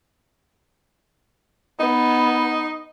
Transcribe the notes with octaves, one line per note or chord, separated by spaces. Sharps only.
B3 D#4